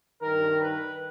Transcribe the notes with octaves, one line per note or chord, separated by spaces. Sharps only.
G2 D#3 A#4
B4